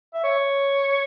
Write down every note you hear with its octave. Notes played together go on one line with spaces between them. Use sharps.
E5
C#5